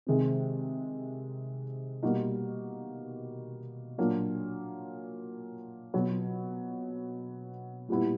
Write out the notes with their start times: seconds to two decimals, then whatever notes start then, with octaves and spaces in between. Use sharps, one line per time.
0.07 C3 D#3 G#3 C4
2.03 B2 G3 A#3 D#4 F#4
3.98 A#2 F#3 A#3 D4
5.94 B2 F#3 B3
7.89 A#2 G3 B3 E4